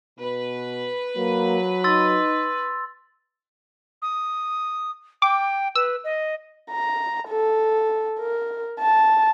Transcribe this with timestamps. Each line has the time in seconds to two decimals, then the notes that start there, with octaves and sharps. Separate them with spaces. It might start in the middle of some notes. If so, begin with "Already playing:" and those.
0.19 B2 B4
1.17 F#3 A#3
1.84 D#4 C6 E6 A6
4.02 D#6
5.22 G5 D6
5.75 B4 E6
6.04 D#5
6.71 A#5
7.28 A4
8.20 A#4
8.79 A5